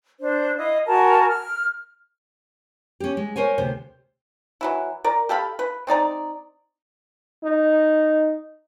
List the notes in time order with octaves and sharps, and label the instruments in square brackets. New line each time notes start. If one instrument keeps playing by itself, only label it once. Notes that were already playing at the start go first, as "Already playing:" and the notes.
[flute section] D4 C5
E4 D#5 F5
F#4 A#4 G#5 A5
F6
[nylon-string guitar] C#4 G4
G#3
A#4 C5 C#5 G#5
D2 C3 C5
[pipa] E3 F#3 E4
A#4 D5
G4 A4 F5 B5
B4
C4 D#4 D5 A#5
[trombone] D#4